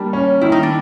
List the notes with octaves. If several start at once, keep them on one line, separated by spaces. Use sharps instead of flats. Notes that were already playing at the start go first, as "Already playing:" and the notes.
Already playing: G3 A#3 D4
C#4
D#3 E4
D#4
D4